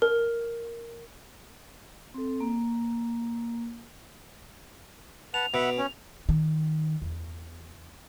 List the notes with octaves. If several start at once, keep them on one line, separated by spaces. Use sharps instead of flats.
A#4
C4 A4
A#3
B4 F#5 A5 F7
B2 E5 F#5 B5
C#4
D#3
E2